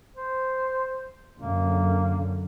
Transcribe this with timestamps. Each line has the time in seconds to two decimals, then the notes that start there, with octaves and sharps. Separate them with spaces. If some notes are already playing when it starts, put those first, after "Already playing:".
0.16 C5
1.38 F#2 D3 A#3